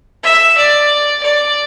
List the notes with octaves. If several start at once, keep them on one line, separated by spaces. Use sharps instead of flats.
E5
D5
D5